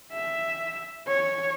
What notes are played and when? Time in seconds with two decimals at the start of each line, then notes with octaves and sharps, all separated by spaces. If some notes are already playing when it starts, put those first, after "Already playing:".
0.12 E5
1.07 C#5